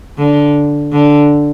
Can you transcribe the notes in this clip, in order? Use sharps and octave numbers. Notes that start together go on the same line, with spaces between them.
D3
D3